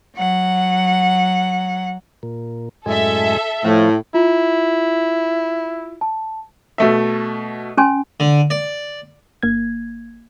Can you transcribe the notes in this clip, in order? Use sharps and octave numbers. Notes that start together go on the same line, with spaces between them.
F#3 F#5
A#2
F#2 A2 G#3 A4 E5
A2 F3 A3
E4 F4
A5
B2 A3 E5
C#4 G#5 C6
D3
D5
G1 A#3 G#6